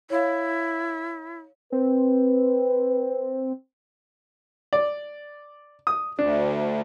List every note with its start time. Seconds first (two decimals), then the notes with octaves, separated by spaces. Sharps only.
0.10 E4 C#5 F5
1.72 C4 B4
4.73 D5
5.87 D#6
6.19 D2 D4